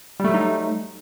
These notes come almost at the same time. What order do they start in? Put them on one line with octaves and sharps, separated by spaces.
G3 A3 F#3 D#4